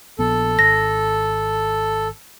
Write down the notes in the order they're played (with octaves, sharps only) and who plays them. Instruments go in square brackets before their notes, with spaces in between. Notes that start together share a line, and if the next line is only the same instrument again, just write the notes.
[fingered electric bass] A#1 B3 [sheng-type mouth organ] A4
[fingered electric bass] G#1 [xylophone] A#6